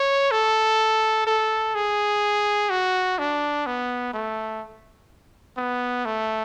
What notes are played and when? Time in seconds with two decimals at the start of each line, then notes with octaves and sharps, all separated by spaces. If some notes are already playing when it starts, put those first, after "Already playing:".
Already playing: C#5
0.31 A4
1.26 A4
1.75 G#4
2.70 F#4
3.18 D4
3.66 B3
4.13 A3
5.57 B3
6.05 A3